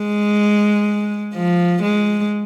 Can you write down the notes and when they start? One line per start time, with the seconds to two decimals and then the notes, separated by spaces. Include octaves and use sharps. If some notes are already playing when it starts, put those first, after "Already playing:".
Already playing: G#3
1.34 F3
1.82 G#3